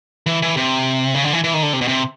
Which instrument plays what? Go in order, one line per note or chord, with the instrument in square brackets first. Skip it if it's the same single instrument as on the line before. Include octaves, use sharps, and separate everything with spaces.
[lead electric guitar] E3
E3
C3
C#3
D3
E3
E3
D#3
D3
C3
B2
C3